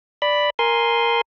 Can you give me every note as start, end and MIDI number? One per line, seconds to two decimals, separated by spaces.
0.22 0.50 74
0.22 0.50 83
0.59 1.21 70
0.59 1.21 80
0.59 1.21 84